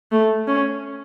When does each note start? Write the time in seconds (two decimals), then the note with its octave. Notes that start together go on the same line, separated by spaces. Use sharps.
0.12 A3
0.47 C#4